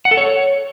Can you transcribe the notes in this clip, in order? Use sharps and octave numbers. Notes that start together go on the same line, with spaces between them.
F#5
A4
C#5